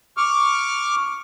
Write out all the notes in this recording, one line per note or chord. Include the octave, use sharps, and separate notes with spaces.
C#6 D6 F6